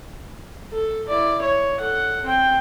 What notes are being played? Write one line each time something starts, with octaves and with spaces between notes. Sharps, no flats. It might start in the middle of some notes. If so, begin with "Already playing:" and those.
A4
E4 D5
C#5
A4 F#5
C4 G5